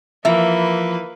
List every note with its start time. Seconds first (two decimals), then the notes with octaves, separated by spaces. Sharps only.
0.25 E3 F3 A#3 B4 E5